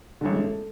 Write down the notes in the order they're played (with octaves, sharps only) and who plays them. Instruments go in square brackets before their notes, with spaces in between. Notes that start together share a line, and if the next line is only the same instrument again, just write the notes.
[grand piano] A1 G2 D3 [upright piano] G3
[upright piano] G#3
A3